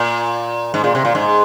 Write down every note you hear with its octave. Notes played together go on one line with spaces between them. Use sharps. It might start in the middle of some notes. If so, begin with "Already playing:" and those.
Already playing: A#2
G#2
A#2
C3
A#2
G#2